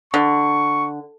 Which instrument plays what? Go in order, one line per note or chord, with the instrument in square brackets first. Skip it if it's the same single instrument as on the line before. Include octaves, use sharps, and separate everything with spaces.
[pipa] D3 [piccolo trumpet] C#6